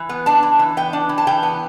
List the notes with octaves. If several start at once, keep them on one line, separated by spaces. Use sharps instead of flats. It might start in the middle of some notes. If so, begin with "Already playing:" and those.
Already playing: E3
B3
D4 A5
E3
E3
B3 G5
D4
E3
A5
E3 G5
B3